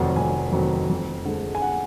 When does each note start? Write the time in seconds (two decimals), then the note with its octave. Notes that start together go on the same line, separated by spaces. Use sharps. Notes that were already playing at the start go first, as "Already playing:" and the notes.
Already playing: F1 F2 D#3 F#3 D5 D#5 F#5
0.16 F1 G#5
0.52 F2 D#3 F#3
0.90 F2
1.25 D3 G#3
1.55 G#5
1.62 F#5